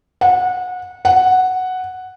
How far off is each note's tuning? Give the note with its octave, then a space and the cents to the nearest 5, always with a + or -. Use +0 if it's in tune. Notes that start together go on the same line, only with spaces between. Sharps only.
F#5 -25
F#5 +0